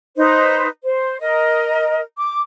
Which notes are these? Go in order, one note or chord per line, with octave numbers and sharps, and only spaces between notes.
D#4 B4 C5
C5
A#4 D#5
D6